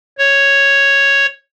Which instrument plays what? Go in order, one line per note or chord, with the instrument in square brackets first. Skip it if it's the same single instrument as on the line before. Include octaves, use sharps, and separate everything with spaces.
[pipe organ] C#5